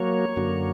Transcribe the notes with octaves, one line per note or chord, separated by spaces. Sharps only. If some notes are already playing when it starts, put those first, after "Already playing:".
Already playing: F#3 A#3 C#5
F#2 D3 F#3 A#3